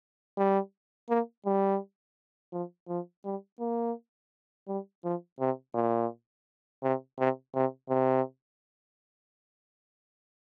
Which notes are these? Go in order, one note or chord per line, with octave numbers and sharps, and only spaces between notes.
G3
A#3
G3
F3
F3
G3
A#3
G3
F3
C3
A#2
C3
C3
C3
C3